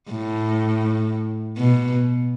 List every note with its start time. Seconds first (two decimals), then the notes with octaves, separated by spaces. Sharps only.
0.11 A2
1.58 B2